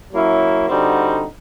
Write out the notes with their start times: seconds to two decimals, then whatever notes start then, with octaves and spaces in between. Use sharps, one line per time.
0.12 F#3 A#3 C#4 E4
0.68 D3 G3 C4 D#4 F#4